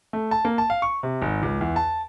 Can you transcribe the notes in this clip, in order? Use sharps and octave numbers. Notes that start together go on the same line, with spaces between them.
A3
A5
A#3
A5
F5
C#6
C3
G#1
C#2
E2
A5